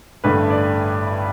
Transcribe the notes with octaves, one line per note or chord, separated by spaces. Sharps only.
A1 G2 D3 A3 B4
D5